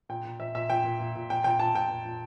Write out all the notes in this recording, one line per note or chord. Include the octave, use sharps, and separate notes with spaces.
A#2 G5
A#2
A#2 E5
A#2 E5
A#2 G5
A#2
A#2
A#2
A#2 G5
A#2 G5
A#2 A5
A#2 G5
A#2
A#2